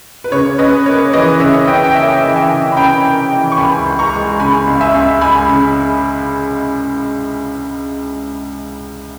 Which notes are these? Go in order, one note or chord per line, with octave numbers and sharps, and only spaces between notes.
B4
C#3 C#5
C#4 B4 D#5
A#3 C#5
E3 B4 D#5
C#3 C#5 E5
C#4 D#5 G5
G5
A#3 E5 G#5
E3
E5 G#5
C#3
B5
C#4 G5 A#5
A#3
E3
C#6
C#2 G#5 B5
C#2
A#5 C#6
G#3
C#3 G#5 B5
C#2
E5 G#5
C#2
G#3 G#5 B5
C#3